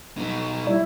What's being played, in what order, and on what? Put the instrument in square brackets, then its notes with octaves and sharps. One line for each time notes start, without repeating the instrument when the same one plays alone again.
[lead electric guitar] B2 D#4
[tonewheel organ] G3 [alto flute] E4